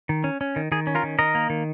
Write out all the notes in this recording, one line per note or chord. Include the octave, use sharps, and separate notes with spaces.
D#3
C#4
C#4
D#3
D#3 G#4
C#4
F4 A#4
D#3
D#3 A#4 D#5
A#3
D#3